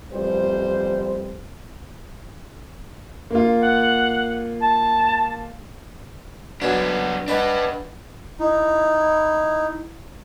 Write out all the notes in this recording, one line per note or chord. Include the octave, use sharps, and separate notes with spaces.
A1 F2 G3 C5
A#3 F4
F#5
A5
B1 B3 C#4 D4 F#4
D4 B4 D#5 F#5 A5
D#4 E4